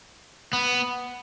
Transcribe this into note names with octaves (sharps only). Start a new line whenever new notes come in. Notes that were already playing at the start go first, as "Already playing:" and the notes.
B3